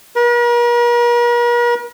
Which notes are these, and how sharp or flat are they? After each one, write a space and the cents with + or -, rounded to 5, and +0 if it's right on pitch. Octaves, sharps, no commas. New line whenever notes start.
A#4 +45